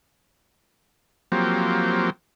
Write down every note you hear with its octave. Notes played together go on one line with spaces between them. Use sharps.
F3 F#3 A#3 C4 G4